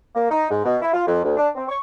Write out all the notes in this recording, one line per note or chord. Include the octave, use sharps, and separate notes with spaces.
A#3
D#4
G#2
B2
E4
F4
F2
D2
D4
C4
C#6